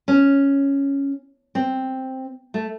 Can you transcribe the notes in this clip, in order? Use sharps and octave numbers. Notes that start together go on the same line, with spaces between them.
C#4
C4
A3